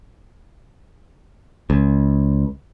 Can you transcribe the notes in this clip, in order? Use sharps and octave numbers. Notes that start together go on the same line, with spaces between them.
C#2